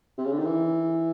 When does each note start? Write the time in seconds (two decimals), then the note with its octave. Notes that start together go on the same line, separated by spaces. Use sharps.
0.18 C3
0.25 C#3
0.32 D3
0.39 D#3
0.46 E3